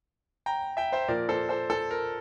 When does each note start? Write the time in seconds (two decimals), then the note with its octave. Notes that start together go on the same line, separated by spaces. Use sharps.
0.46 G5 A#5
0.77 E5 G5
0.92 C5 E5
1.08 A#2 F3 A#4 D5
1.29 A4 C5
1.49 A4 C5
1.70 A4
1.91 A#4